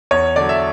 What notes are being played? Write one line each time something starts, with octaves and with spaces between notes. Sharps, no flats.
E2 C#5
D3 F#3 D5
E5